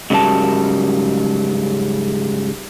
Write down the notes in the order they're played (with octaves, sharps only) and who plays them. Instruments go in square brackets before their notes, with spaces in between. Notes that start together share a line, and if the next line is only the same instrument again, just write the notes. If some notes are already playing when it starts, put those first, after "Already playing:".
[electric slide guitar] G#2 C#3 F#3 G3 A#4 A5